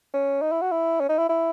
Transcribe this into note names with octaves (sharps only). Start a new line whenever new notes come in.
C#4
D#4
E4
F#4
E4
C#4
D#4
E4
E4